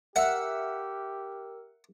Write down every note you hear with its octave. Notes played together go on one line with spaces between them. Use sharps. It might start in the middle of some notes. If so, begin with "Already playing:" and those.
G4 A#4 E5 F#5 E6